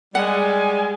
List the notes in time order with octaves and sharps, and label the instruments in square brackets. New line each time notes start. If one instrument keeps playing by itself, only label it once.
[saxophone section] G3 [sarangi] G#3 [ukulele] F#5 [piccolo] G#5